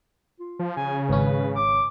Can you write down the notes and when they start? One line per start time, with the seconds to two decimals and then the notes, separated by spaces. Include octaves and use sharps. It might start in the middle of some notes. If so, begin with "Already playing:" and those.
0.39 F4
0.59 F3
0.77 C#3 G#5
1.09 G#1 C#4 B4
1.56 D6